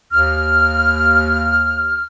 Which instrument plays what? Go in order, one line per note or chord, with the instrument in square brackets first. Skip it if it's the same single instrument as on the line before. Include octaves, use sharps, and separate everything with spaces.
[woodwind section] D#2 F6